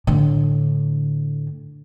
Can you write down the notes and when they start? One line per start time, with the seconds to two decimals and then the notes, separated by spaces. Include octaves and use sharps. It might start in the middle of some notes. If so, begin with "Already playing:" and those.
0.07 A2 D3